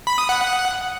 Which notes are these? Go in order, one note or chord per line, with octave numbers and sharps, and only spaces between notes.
B5
D#6
F#5